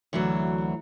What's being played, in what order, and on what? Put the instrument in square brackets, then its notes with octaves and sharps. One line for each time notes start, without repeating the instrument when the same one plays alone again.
[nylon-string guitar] D2 E3 F#3